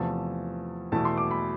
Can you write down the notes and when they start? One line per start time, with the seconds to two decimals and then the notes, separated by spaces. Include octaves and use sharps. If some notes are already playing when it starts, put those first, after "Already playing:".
Already playing: E2 C3 F3 A3 A5
0.92 E2 B2 A3 E4 A5
1.05 C6
1.17 D6
1.31 B5